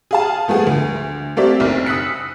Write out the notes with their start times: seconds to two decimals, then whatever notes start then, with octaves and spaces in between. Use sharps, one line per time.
0.11 G#4 F5 A5
0.48 F3 A3 B3 G#4
0.67 D2
1.37 A3 A#3 C4 G4 D5 E5
1.60 F#1 B1 C4 F6
1.86 D#6 E6 F#6 B6 C#7